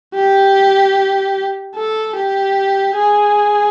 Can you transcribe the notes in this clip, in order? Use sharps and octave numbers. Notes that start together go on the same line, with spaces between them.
G4
A4
G4
G#4